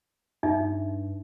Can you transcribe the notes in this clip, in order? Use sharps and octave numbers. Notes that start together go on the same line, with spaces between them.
G2 D#4 E5